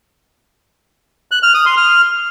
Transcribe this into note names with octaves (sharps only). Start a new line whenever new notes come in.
F#6
F6
D#6
C6
F6